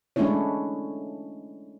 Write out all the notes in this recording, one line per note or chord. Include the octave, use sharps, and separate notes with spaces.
G#3 A3 C#4 D4 E4 C#5